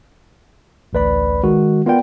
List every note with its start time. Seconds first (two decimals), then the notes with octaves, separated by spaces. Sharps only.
0.93 A1 D2 B4 D5 B5
1.43 D#3 G#3 F#4
1.86 B3 F4 A#4 D5 G5